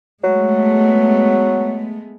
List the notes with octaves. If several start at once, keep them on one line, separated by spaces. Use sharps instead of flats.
F#3 G#3 A3 B3